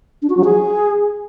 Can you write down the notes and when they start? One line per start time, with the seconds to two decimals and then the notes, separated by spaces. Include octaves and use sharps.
0.22 D4
0.30 F#4
0.37 F#3
0.45 G#4